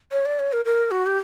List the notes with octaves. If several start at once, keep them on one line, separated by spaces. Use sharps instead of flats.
C#5
D5
C#5
A#4
A#4
F#4
G4